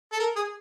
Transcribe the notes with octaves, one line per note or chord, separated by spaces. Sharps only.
A4
A#4
G#4